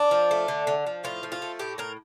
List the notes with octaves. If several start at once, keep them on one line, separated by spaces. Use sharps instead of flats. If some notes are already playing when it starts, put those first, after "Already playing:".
Already playing: D4
F3
A3
D3
D3
F3
A2 F4
F3
F4
A3
A2 G4
A2 A#4